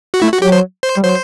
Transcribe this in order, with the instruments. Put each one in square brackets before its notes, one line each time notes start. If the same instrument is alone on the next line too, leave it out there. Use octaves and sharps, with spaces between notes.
[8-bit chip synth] F#4
[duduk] A3 [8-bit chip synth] E4
[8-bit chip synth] F#4
[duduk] F#3 [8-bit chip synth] G4
[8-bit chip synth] C5
C5
[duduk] G3
[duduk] F#3 [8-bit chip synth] C5